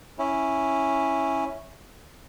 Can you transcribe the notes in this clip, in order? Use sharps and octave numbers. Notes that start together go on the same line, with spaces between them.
C#4 E4